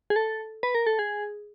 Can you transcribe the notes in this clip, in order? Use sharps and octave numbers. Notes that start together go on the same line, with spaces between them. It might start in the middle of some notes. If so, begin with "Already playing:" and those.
G#4
A4
B4
A#4
A4
G#4